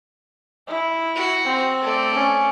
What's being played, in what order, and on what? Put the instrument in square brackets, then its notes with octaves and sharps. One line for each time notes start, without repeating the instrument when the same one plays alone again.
[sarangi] E4
[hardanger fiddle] F#4
[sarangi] C4
[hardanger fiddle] A3 D5
[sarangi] C#4